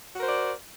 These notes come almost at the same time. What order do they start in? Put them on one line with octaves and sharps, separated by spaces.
F#4 A#4 C5 D5